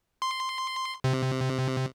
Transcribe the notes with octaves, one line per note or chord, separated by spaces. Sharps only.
C6
C3